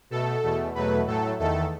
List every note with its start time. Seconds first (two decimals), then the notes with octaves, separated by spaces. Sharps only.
0.10 B2 A3 A4
0.43 E2 B2 A3
0.75 E2 B2 F#3 A3 B4
1.06 A2 F#3 A3 A4
1.39 E2 D#3 A3 A4